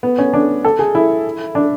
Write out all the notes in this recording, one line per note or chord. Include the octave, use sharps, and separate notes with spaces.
B3
C#4
D4
A4
G#4
E4
D4